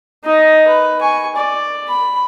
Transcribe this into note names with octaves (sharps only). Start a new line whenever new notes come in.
D#4 D#5
B4
G#5 C#6
D5
B5